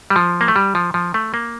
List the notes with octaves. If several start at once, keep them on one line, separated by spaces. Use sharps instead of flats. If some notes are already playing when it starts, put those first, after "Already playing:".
G3
F3
A#3
A3
G3
F3
F3
A3
A#3